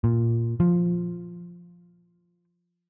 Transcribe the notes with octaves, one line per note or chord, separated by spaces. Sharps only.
A#2
F3